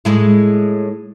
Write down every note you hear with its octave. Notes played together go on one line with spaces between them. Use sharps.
A2 G#3 E4